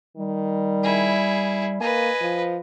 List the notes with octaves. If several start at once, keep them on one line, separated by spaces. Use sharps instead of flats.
D#3 G3
E4 G#4
A#3 B4 D#5 G#5
F3